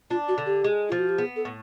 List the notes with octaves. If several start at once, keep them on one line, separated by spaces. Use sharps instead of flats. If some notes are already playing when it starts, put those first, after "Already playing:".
D4 F4
F#4
D3
G4
G#3
F3 F4
F#4
G4
B3 G#4
A4
A2